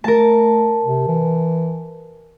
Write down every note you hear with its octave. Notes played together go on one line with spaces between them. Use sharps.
A3 A#4 A5
C3
E3